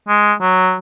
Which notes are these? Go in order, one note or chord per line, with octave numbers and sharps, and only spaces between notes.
G#3
F#3